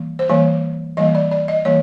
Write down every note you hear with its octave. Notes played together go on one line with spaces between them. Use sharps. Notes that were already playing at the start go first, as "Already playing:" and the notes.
Already playing: E3 G3 A#3
C5
E3 G3 A#3 C#5
E3 G3 A#3 D#5
D5
D5
D#5
E3 G3 A#3 C#5